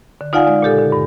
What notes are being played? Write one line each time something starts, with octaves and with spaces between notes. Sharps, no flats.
D3
D#4 F4 D5 F5 F#5 G#5
G#3 D5
A#2 C#3 G4 A4
D3
G2